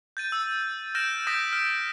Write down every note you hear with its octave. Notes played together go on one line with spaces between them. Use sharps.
G6 A6 D#7
E6
F6 G6 A#6 D7 E7
D#6 G6 A#6 B6 D7
F6 D7